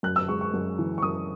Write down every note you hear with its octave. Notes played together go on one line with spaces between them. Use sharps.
F#2 F#6
E6
G#3 C#6
C#6
F#2
E3
C#6
F#2 D#6